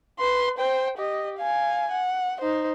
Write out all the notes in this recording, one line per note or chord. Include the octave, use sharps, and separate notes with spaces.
B4 C6
C5 G5
G4 D#5
F5 G#5
F#5
D#4 C5